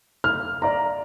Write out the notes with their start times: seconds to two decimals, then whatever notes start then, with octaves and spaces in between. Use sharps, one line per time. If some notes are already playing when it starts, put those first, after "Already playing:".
0.24 F6
0.62 D5 A#5